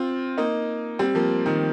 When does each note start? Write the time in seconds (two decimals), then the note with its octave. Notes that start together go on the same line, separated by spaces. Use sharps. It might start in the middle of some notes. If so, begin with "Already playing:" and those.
Already playing: C4 F4
0.38 A#3 D#4
0.99 G3 C4
1.15 F3 A#3
1.46 D#3